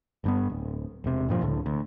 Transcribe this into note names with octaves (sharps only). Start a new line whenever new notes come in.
G1 G2 B3
D1
E1 C3
G2 A#2 F3
C#2 A2 D3
D2